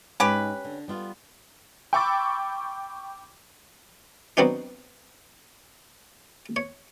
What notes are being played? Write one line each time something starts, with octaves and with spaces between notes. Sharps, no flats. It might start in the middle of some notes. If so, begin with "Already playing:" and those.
G#2 C#4 G4 B4
D3
G3 B3 F4
G5 B5 C#6 D6 E6 A6
F#3 B3 C4 D4 D#4
C#5